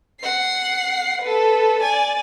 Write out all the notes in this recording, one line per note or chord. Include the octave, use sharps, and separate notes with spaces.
F#5 C7
A4 B4
D5 G#5